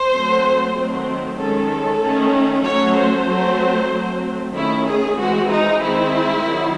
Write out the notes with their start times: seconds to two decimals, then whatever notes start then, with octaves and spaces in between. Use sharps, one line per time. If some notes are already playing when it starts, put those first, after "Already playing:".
Already playing: C5
0.11 F#3 A3 C4
0.75 D#3 F#3 A3 C4
1.38 D#3 G#3 C#4 A4
2.01 D#3 A3 C#4
2.64 F#3 A3 C#4 C#5
2.96 C5
3.28 F#3 A3 C4
3.91 F#3 A3 C4
4.55 D#3 A3 C#4 E4
4.87 G#4
5.18 E3 G#3 C4 F#4
5.50 D#4
5.82 D#3 G#3 C4 E4
6.45 D#3 F#3